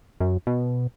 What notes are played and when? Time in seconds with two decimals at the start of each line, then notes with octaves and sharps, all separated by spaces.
0.20 F#2
0.47 B2